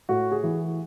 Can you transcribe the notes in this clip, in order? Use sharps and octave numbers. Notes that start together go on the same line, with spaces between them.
A2 F#4
G#4
E3